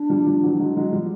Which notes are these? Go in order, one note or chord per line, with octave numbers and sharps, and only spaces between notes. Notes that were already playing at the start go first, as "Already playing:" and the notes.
Already playing: D4
F3 G3
F3 G3
E3 F#3
F#3 G#3
F#3 G#3
F3 G3